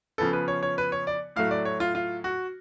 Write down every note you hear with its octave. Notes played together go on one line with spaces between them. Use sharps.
C#3 F3 B3 A4
B4
C#5
C#5
B4
C#5
D5
A2 F#3 A3 F5
D5
C#5
F4
F4
F#4